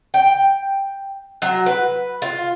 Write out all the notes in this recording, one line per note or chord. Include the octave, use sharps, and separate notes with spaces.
G5
F#3
B4
F4